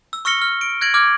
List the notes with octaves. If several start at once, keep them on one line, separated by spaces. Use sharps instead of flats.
E6
C#6 E6 F6 A#6 C#7 G7
F6
D7
F#6 G#6 A#6 D7 F#7
D6 F6 F#6 G#6